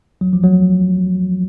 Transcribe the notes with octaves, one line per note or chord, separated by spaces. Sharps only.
F#3
F3
F#3